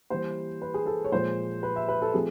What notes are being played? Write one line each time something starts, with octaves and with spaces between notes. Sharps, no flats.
E3 G3 A#3 C5
B4
G#4
A4
C#5
A#2 F3 G#3 C5
B4
E5
B4
A4
F3 A3 C4 G#4